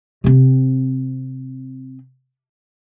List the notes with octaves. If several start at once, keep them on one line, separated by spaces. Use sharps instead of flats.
C3 C4